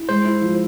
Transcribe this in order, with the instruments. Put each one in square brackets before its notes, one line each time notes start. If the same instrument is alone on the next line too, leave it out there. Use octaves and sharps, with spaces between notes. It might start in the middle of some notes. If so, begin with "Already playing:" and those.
Already playing: [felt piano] E4
[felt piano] G#3 [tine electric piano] C5
[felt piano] E4
F3